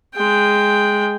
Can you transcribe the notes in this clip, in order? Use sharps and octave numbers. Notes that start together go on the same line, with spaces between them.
G#3 G5